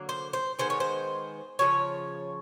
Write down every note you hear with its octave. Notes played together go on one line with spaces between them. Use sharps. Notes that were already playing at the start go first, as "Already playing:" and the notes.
Already playing: D3 F#3 A#3
C5
C5
D#3 G#3 B3 C5
C#5
C5
C#3 F3 C#5